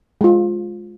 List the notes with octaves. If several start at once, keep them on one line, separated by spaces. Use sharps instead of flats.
G#3 F4